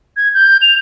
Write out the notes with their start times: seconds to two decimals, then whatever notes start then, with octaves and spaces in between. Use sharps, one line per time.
0.17 G#6
0.34 G6
0.62 F7